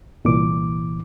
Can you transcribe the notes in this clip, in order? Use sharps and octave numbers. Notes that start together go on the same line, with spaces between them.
C2 A#2 E3 D6